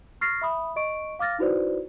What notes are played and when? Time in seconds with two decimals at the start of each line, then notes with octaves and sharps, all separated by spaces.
0.21 C#6 F6 A6 A#6 C7
0.42 E5 B5 D#6
0.76 D#5 C#6 D7
1.19 F5 D6 F6 A6 A#6
1.39 D#4 E4 F#4 B4 C5 D5